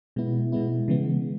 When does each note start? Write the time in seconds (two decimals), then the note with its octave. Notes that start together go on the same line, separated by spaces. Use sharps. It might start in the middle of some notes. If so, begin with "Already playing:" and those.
0.16 B2 G#3 B3 E4
0.52 B2 G#3 B3 E4
0.88 C#3 E3 G#3 B3